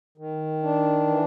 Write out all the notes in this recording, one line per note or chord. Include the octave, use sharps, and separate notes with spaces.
D#3
D4
E3